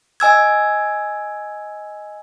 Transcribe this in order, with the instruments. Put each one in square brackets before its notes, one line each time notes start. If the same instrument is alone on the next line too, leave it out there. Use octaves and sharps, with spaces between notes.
[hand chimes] D#5 G#5 E6 G#6